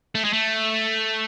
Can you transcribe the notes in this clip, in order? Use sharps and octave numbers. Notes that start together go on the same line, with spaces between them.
A3
G#3
A3